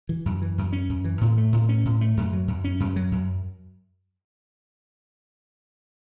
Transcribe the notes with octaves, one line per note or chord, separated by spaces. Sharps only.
E3
F#2
E3
F#2
C#4
F#2
E3
A2
A3
A2
C#4
A2
A3
F#2
F#3
F#2
C#4
F#2
F#3
F#2